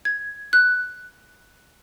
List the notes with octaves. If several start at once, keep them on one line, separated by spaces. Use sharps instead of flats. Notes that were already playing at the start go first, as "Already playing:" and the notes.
G#6
F#6